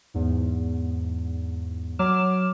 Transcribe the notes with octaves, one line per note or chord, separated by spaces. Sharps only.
E2 G#2
F#3 D6 F6 E7